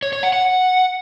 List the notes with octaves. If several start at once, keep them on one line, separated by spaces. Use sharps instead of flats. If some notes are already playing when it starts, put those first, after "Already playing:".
C#5
C#5
F#5
F#5